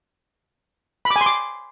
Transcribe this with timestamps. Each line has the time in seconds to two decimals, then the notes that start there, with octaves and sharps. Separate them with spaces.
1.05 B5
1.10 D6
1.16 G#5
1.21 C6
1.26 D6